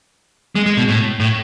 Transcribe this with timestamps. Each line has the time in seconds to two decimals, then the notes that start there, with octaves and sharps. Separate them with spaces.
0.55 G#3
0.66 G#3
0.77 B2
0.88 A2
1.20 A2